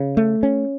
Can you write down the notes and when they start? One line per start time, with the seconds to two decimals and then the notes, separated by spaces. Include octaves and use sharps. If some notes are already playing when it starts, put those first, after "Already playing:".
Already playing: C#3
0.17 A3
0.43 C#4